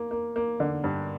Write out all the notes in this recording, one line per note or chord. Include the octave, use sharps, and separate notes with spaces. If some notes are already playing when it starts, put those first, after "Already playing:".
Already playing: A#3
A#3
A#3
D3
G2